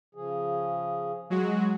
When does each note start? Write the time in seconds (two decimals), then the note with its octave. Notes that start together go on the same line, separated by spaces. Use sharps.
0.15 C#3 F3 G#4
1.30 F#3 G#3 F#4